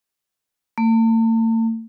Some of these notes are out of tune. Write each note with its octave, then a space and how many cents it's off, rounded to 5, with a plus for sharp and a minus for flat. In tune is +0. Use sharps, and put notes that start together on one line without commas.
A3 +45